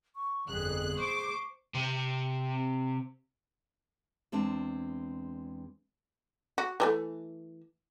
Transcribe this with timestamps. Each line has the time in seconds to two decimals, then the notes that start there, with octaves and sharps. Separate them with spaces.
0.16 C#6
0.49 G1 F2 G#4 F#6
0.98 C5 C#6 D6
1.74 C3 C4
4.32 E2 G#3 C4 D4 A5
6.58 F#4
6.80 E3 F#3 A3